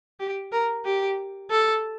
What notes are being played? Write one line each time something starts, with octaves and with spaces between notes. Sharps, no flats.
G4
A#4
G4
A4